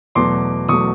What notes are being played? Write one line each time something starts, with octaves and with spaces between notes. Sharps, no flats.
E2 B2 F#3 A3 C6 D6
E2 B2 F#3 A3 C#6 D#6